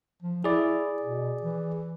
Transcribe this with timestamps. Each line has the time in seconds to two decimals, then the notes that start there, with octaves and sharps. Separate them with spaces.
0.22 F3
0.44 E4 G#4 D5
1.02 B2
1.43 E3